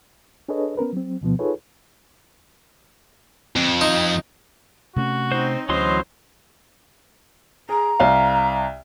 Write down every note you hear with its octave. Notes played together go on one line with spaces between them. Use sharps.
D4 G#4 A4 B4 C#5 D#5
B3 C#4 A#4 B4
F#3 C4
D2 B2 F3 B3
D#4 F4 G#4 A4 B4 C#5
F2
D#4
C3 A3 C#4 F#4
C4 D#4 C5
D2 E3 F#3 C#4 C5 D#5 C6
G#4 A#5
C2 F5